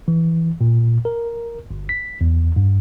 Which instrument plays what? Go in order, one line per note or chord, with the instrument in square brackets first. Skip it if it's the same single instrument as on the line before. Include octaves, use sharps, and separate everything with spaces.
[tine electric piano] E3
A#2
A#4
G1
B6
E2
G2